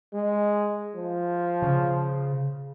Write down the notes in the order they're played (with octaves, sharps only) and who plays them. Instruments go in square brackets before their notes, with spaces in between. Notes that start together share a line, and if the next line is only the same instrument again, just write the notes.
[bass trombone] G#3
F3
[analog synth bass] C#3